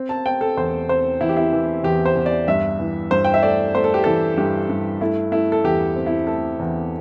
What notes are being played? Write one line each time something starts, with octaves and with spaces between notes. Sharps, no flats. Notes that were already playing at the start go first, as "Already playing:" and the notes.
Already playing: C4
A5
C4 G5
A4
E2 C5
C4 C5
E2 E4
G4
E4
E3
E2 G4
C5
E2
D5
G2 E5
E3
G2 C5
G5
E5
A3 D5
A3 C5
A4
G4
E3 A4
G2 G4
G2
A3 E4
A3 E4
A4
E2 G4
C4
E4
A3 A4
E2